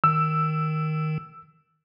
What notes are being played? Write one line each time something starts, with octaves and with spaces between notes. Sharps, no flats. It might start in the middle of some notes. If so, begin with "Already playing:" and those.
D#3 E6